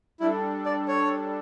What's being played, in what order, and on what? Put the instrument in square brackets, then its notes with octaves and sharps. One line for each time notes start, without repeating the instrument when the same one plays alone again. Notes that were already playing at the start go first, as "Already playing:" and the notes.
[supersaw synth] G3 D4 A4 [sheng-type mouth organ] E4
[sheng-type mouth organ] D5
C#5